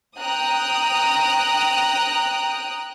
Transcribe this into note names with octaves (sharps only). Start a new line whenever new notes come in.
G5 A#5 D#6 F#6